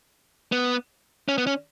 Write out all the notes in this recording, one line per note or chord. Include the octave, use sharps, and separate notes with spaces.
B3
C#4
B3
C#4